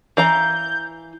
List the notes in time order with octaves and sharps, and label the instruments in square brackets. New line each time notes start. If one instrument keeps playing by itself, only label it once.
[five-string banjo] E3 F5 A#5 [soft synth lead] G6